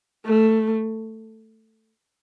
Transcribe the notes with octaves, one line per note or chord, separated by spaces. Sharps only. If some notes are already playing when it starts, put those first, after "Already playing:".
A3